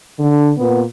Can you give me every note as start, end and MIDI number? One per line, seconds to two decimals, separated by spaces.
0.19 0.51 50
0.58 0.82 46
0.58 0.82 59